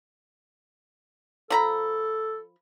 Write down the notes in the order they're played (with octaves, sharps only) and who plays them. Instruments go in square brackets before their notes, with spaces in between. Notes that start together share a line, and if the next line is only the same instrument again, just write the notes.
[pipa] F3 A#5 B5 [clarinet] A4